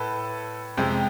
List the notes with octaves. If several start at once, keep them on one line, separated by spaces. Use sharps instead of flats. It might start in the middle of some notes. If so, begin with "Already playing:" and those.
Already playing: A2 A4 B4
F2 C3 G#3